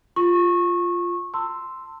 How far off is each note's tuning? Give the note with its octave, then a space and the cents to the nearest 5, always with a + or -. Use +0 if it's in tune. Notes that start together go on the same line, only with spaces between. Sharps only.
F4 +0 C#6 -20
A5 +40 C6 -5 E6 +0